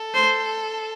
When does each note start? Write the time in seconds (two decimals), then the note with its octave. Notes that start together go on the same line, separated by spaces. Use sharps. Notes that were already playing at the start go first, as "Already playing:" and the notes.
Already playing: A4
0.14 C5